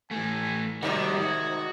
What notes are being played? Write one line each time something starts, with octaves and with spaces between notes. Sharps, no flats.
E3 A3 G#5
G#2 C3 D#3 G3 F#4 D5
F#4 G#6